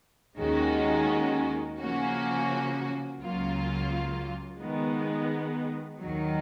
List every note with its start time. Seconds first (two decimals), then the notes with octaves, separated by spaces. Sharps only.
0.39 D#2 D#3 G#3 C#4 F#4
1.79 C#3 F3 A#3 C#4 F#4
3.19 C#2 C#3 F#3 A#3 F4
4.59 D#3 G#3 B3
6.00 D#2 D#3 F#3